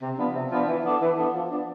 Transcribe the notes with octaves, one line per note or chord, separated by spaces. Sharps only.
C3
F3 B3 D4
C3
F3 B3 D4
E3
B3 D4 A4
E3
B3 D4 A4
F3
B3 D4